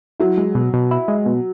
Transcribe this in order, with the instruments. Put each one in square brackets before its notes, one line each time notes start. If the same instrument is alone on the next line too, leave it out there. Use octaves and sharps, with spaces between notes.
[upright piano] F#3 [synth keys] E4
[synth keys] G#3
B2
B2
E4
G#3
B2